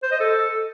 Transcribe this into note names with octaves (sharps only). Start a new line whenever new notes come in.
C5
D#5
A4